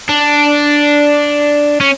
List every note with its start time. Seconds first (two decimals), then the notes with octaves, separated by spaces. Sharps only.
0.09 D4
1.80 C#4